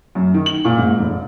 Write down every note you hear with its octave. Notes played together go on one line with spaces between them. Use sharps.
F#2
D#3
F#7
A#2
G#2
F1